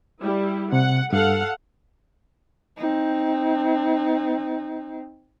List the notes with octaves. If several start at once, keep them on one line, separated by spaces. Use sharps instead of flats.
G3 E4
C3 F#5
G2 A4 F5 F#5
C4 D#4